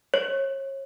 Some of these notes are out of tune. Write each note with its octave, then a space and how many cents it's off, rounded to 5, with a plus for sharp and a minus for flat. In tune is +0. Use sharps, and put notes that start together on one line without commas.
C#5 -35